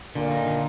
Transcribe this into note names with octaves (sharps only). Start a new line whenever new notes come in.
A#2 D3
D#4
D3